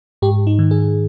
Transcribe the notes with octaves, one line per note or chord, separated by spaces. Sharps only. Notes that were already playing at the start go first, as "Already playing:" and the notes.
G#2 G4
D#4
D#3
G#4